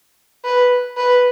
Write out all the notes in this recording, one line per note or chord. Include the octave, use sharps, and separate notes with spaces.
B4
B4